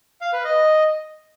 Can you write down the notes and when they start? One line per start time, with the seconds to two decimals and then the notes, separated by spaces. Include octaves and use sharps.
0.21 F5
0.33 B4
0.44 D#5